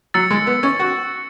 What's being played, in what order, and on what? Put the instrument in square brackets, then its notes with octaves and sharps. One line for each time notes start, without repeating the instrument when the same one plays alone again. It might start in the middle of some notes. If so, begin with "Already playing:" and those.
[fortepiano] F#3 [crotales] E6 A6 C#7
[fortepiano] G#3
B3
C#4
F#4